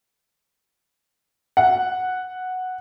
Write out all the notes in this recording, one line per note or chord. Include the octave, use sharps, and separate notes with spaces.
F#5